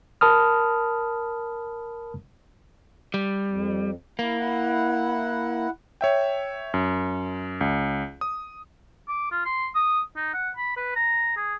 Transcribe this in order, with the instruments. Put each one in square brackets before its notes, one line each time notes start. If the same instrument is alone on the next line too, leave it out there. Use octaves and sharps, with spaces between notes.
[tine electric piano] A#4 A5 B5 D#6 F6
[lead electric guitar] G3
[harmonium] F2
[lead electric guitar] A#3 [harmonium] E4
[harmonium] E4 F#5
[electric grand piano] C#5 E5 G5
F#2
C#2
D#6
[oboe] D6
F4
C6
D#6
D#4
F#5
B5
B4
A#5
G#4